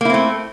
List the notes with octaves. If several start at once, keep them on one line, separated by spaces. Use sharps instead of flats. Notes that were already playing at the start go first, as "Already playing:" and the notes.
A3 A#3 C4 E4